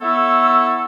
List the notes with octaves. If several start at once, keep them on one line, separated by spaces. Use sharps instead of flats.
A3 B3 E4 A4 C#5 E6